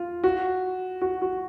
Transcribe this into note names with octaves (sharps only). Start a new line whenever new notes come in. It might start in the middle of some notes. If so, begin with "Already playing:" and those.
Already playing: F4
F#4
F#4
F#4